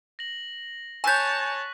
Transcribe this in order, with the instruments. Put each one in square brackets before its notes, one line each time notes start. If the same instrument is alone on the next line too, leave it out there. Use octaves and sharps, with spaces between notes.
[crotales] A#6 F#7
[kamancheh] C#5 A5 [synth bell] G#5 G6 [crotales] C#6 F#6 B6